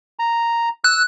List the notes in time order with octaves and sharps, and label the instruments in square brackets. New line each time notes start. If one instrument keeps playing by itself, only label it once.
[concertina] A#5
[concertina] E6 [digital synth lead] F#6